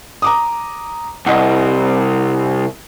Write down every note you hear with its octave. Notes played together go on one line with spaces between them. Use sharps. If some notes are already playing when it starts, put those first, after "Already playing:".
A#5 D6 D#6
C2 D#5 F#5